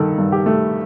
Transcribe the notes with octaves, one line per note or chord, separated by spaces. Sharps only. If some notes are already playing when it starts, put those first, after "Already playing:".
Already playing: G2 D#3 A4
G2
G4
A3